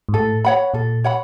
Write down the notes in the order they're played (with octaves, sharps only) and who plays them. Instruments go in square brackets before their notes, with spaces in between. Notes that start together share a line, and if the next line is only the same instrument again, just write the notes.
[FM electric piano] G#2
[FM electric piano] A2 [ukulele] A4
[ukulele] C#5 F#5 B5
[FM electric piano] A#2 [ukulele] A4
[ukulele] C#5 F#5 B5